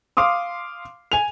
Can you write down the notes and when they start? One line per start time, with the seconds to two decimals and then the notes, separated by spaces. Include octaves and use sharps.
0.17 F5 C6 D6 D#6
1.12 G#5 F7